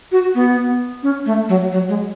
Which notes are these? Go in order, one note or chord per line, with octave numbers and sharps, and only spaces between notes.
F#4
B3
C#4
A3
F#3
F#3
G#3